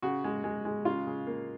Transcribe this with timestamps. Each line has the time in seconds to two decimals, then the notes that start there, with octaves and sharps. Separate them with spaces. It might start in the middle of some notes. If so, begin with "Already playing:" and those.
0.02 C#3 F#4
0.24 G#3
0.44 G#3
0.65 G#3
0.85 C#3 F4
1.07 C#3
1.27 A#3